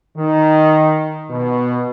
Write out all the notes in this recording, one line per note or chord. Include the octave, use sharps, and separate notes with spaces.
D#3
B2